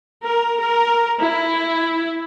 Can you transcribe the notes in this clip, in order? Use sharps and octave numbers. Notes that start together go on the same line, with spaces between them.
A#4
A#4
E4